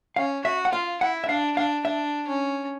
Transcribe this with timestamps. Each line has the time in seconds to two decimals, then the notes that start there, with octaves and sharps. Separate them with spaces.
0.16 C#4 F5
0.45 F#4 E5
0.65 F#5
0.73 F4 F5
1.01 E4 F#5
1.24 E5
1.28 D4 F5
1.56 D4 F5
1.85 D4 E5
2.28 C#4